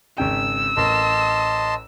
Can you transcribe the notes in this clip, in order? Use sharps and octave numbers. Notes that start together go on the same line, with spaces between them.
G#1 C#3 G5 E6
A1 A#4 D#5 A5 C6